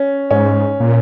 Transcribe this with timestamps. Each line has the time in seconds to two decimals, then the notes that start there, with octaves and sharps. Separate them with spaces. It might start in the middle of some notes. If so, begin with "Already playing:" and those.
Already playing: C#4
0.31 G#2 C#4
0.80 A#2